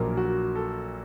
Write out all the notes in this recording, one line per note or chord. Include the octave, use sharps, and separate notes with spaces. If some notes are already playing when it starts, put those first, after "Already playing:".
Already playing: A#1 A#2 F#3 A#3 A#4
F#4
A4